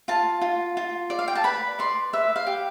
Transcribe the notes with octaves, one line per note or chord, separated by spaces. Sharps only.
F4 A5
F4
F4
D5
F5
G5
A5
B4 B5
D5 C6
B4 E5
F5
G4